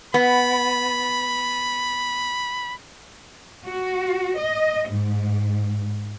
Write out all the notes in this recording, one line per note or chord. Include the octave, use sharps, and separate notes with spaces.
B3 B5
F#4
D#5
G#2